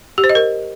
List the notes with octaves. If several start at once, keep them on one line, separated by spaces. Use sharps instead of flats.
G4
C5
D#5
A#4